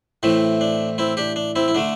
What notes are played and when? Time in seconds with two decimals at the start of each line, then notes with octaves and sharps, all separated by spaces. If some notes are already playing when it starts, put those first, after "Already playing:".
0.23 A2 E3 A3 C4
0.61 D4
0.98 C4 E4
1.17 D4 G4
1.36 D4
1.56 C4 E4
1.68 E4
1.75 D3 A3 D4